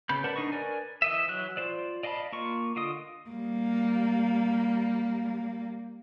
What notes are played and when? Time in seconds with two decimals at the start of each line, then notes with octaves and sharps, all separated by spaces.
0.09 C#3 B3 B5 G6
0.24 A#4 B4 D5 F#5 A5
0.36 D4 D#4 D#5 C#6
0.52 A#4 B4 D5 G#5
1.02 E3 D#5 E5
1.28 E3 F#3 F#6
1.57 F4 C5 D5
2.03 D5 D#5 F5 A5 B5
2.32 A#3 F4 C#6
2.76 D3 F4 D#5 D#6
3.30 G3 A#3